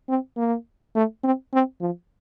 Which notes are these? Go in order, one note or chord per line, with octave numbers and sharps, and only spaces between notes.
C4
A#3
A3
C4
C4
F3